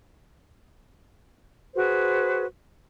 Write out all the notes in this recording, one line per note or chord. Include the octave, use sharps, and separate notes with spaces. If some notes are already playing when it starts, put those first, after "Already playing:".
F#4 G#4 B4 C5